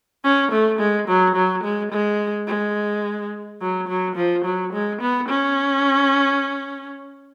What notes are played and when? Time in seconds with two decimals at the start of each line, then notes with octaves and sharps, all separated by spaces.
0.24 C#4
0.52 A3
0.79 G#3
1.08 F#3
1.36 F#3
1.63 G#3
1.92 G#3
2.47 G#3
3.61 F#3
3.88 F#3
4.16 F3
4.45 F#3
4.73 G#3
5.01 B3
5.29 C#4